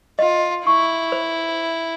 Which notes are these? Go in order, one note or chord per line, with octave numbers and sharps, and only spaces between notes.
F4 D#5
E4 C#6
C5